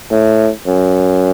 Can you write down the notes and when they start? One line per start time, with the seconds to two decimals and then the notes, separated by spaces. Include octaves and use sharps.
0.11 A2
0.67 F#2